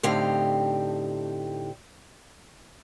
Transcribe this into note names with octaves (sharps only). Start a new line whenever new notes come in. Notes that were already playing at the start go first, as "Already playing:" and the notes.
A2 D3 C4 D#4 G4 F5